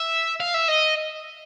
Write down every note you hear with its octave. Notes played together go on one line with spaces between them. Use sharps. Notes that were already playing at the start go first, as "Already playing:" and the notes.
Already playing: E5
F5
E5
D#5